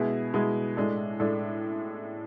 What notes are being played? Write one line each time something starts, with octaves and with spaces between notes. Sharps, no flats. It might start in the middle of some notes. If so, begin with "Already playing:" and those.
Already playing: B2 G#3 B3 E4 G#4
B2 G#3 B3 E4 G#4
A2 G#3 D4 A4
A2 G#3 D4 A4